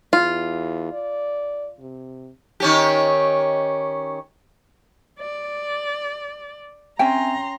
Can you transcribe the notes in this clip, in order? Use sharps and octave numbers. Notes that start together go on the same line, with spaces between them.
E2 F4
D5
C3
D#3 C#4 G4
D5
C4 C#4 E5 G5 G#5 A#5 C6